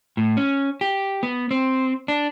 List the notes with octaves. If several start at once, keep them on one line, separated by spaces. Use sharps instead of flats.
A2
C#4
G4
B3
C4
D4